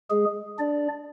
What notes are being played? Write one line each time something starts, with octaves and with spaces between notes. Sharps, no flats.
G#3 G#4
D4 D5